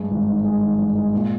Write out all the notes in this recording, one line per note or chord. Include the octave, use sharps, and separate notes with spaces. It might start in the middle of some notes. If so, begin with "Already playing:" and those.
Already playing: G2 G#3
G#1
D#3
G#3
D#3
G2
G#3
A#2